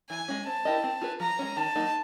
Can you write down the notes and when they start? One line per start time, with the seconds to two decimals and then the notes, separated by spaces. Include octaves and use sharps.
0.10 E3 G#5
0.28 G#3 C#4
0.46 C4 A5
0.65 E4 G4 A#4 D#5
0.84 C4
1.01 F4 G#4 B4
1.20 F3 A#5
1.39 G#3 C#4
1.56 D#3 A5
1.75 F#3 A#3 D#4